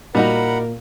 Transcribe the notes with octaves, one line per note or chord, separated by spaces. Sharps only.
A#2 G3 D#4 F#4 A#4 F#5 A#5 B5